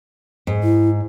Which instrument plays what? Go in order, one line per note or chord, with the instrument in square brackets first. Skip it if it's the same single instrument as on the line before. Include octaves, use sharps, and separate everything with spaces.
[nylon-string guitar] G#2
[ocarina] E4